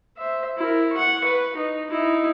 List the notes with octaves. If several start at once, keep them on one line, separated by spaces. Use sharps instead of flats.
C5 E5
E4 A#4
F#5 C#6
B4
D#4
D#4 E4